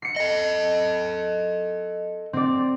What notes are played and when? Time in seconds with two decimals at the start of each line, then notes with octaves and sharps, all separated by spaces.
0.02 C7 C#7
0.16 A4 D#5
2.33 C4 D5